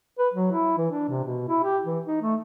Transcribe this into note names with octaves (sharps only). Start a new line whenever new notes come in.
B4
F#3
E4
E3
D4
C3
B2
E4
G4
E3
D#4
A3